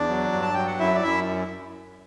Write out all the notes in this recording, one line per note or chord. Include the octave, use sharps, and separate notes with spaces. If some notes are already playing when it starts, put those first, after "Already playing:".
Already playing: E2 D4 D5
F#3
G2
A5
F#3 G5
F#5
F#2 E4 E5
D5
F#2 E4 E5